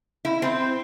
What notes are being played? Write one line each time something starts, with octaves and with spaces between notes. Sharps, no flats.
E4
C4